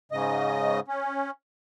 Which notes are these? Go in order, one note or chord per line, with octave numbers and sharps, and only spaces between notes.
G#2 C#3 D#5
C#4